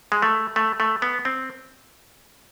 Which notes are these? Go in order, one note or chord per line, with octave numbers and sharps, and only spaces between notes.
G#3
A3
A3
A3
B3
C4